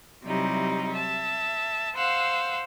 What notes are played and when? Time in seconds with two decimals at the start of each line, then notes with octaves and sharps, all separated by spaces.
0.23 C3 F#3 G3 D#4 E4
0.92 E5 A5
1.95 C5 F5 F#5 E6